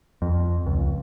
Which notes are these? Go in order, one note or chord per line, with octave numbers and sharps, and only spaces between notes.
F2
C#2